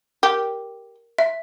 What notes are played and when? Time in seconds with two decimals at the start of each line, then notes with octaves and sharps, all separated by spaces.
0.23 G4 A#4
1.18 E5